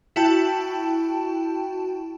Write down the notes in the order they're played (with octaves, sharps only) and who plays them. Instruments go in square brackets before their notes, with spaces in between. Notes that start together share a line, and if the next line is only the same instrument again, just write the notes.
[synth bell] E4 F#4 G5 A5